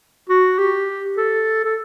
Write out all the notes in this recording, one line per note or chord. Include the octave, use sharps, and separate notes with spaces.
F#4
G4
A4
A4